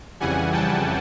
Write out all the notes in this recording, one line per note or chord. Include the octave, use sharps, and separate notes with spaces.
F2 C#3 E3 G3 F#5 G#5
G5 A5